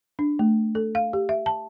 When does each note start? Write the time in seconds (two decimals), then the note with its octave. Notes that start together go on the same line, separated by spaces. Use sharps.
0.19 D4
0.39 A3
0.75 A4
0.95 F5
1.13 G4
1.29 E5
1.46 A5